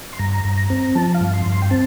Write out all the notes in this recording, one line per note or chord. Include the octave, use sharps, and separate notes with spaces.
C6
G2 A#5
G2
A#5
C4
F3 A5
F5
G2
C6
G2
C6
G5
C4 A5